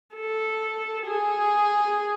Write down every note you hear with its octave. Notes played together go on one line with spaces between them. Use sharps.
A4
G#4